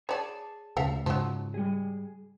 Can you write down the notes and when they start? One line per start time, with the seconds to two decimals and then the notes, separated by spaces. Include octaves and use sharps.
0.09 G#4 C#5 D5 A5
0.77 D2 C#3 A4 E5 F5
1.06 G#2 C#3 F3 F#3
1.54 G3 G#4